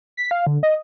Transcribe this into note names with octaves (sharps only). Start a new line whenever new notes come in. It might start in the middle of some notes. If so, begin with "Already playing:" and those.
B6
F5
D3
D#5